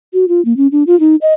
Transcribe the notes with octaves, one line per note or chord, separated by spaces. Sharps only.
F#4
F4
A#3
C#4
D4
F4
D#4
D#5